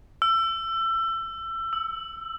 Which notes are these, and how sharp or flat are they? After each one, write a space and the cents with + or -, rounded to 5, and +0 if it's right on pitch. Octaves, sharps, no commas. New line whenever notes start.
E6 +25
E6 -5